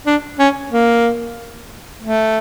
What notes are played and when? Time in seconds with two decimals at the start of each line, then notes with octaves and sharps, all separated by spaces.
0.06 D4
0.39 C#4
0.72 A#3
2.02 A3